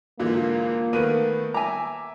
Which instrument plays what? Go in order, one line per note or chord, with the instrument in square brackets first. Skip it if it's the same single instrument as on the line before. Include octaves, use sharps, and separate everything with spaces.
[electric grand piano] G#2 D3 E3 [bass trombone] A#3 [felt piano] F4
[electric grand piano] D#3 A3 B3 [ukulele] A#4 B4 [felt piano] D#7
[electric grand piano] E5 D6 [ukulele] G#5 A#5